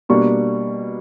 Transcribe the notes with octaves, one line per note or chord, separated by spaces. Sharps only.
B2 G3 A#3 D4 C#6